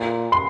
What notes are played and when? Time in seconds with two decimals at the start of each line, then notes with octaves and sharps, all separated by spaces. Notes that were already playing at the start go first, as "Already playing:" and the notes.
Already playing: A#2
0.32 C6